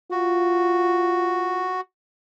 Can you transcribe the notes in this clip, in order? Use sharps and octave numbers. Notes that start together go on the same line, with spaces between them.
F4 F#4